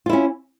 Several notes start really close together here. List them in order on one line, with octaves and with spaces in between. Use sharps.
F4 E4 C#4